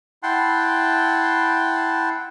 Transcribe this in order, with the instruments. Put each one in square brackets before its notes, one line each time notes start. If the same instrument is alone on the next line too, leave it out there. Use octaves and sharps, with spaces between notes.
[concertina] E4 F#5 G5 A5 C6